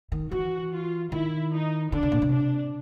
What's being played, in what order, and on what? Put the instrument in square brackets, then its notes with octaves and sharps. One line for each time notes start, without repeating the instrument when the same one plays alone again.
[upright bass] D#3
[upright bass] E3 [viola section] F#4
[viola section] F4
[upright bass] D#3 [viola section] E4
[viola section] D#4
[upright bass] D3 [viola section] D4
[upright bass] C#3
A#2
C3
[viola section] D4